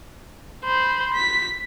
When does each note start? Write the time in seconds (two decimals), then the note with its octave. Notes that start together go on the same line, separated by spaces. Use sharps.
0.65 C5 B5
1.14 B6